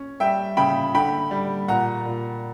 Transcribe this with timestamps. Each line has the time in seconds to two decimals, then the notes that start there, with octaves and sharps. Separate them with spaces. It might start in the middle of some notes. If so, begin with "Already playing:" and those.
Already playing: C#4
0.20 G3 E5 G5
0.57 C#3 G5 B5
0.94 D3 G5 B5
1.31 G3
1.68 A#2 F#5 A#5
2.05 A#2